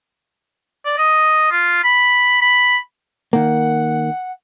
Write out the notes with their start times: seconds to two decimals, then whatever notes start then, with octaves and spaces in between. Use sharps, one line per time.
0.85 D5
0.98 D#5
1.51 F4
1.84 B5
2.41 B5
3.33 D#3 A#3 F#5